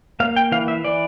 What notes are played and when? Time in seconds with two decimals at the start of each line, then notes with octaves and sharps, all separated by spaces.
0.20 A#3 F5
0.36 G5
0.52 E3 F5
0.68 E5
0.85 E3 D5